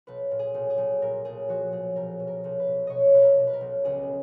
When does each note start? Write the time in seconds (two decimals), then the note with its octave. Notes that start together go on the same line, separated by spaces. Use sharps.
0.07 B1 B4
0.31 A#2
0.39 G#4
0.54 B1
0.70 G#4
0.78 B1
1.01 A#2 A#4
1.25 B1 G#4
1.48 F3 F#4
1.72 B1 G#4
1.96 B1 A#4
2.20 B2
2.27 A#4
2.44 B1
2.60 B4
2.67 B2
2.87 B2 C#5 D#5
3.14 B2 B4
3.22 A#4
3.38 B2
3.47 B4
3.53 A#4
3.61 B1
3.85 C#2 G#4